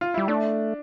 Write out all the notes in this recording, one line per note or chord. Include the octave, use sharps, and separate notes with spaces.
F4
G3 E4
A3 D4